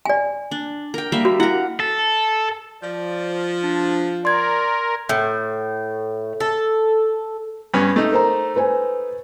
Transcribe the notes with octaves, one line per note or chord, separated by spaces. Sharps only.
D5 G#5
D4
A#4 G5
G3 A#3 E5
F#4
E4 A#4 F#5
A4
F3 D5
D4
A#4 D5 C6 G#6
A2
A4
G2 B3 C#4
A3 D#4
A#4 C5 A#5
B4 C5 G#5